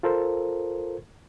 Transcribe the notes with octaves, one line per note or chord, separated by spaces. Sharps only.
F4 A4 A#4 C5